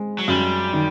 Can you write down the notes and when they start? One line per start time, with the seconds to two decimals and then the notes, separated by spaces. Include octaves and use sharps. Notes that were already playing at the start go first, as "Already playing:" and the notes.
Already playing: G#3 C4
0.18 F#3
0.28 F#2 G3
0.73 D#3